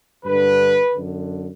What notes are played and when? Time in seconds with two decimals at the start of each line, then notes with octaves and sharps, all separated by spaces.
0.24 G2 D3 B4
0.94 F#2 D3